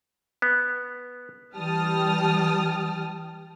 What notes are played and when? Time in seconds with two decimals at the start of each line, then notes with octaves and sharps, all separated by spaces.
0.42 B3
1.54 E3 G3 G5 A5 D#6 F6